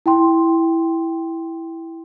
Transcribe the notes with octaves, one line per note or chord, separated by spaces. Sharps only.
E4 G5 C6